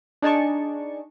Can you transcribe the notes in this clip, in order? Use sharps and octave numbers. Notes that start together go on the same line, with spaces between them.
D4 D#4 G#4 D5 A5 C#6